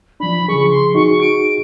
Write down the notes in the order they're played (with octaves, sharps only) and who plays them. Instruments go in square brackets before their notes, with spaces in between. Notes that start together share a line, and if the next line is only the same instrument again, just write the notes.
[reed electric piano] F3 D4 [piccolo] B5
[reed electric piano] C#3 F3 G#4 [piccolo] C#6
[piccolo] C6
[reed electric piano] D#4 F#4 G#4 [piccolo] C#6
[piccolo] D7